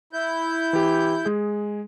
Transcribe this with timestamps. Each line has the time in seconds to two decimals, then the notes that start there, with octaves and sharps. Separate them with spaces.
0.13 E4 G6
0.73 E3 G4
1.25 G#3 G#4